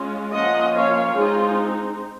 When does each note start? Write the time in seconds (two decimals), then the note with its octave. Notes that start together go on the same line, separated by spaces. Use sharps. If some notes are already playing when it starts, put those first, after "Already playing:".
Already playing: G#3 C#4 F4
0.33 F3 A#3 C#4 F4 D#5 F#5
0.75 C#5 F5
1.17 G#3 C4 D#4 F4 G#4